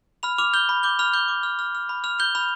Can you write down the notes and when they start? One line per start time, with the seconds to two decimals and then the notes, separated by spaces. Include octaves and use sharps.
0.23 B5 F6 F7
0.38 D6 F6 F7
0.54 F6 G6 G7
0.69 B5
0.83 D6 G6 G7
0.99 B5 F6 F7
1.13 D6 G6 G7
1.28 D6
1.43 F6
1.59 F6
1.75 F6
1.89 B5
2.04 F6 F7
2.19 F6 G6 G7
2.35 B5 F6 F7